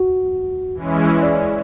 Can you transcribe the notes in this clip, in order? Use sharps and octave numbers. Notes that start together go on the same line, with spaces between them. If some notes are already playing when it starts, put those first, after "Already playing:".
Already playing: F#4
E3 G#3 C#4 E4
D5